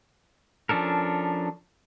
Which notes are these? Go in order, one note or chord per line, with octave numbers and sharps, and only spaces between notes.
F3 C#4 D4 A4 A#4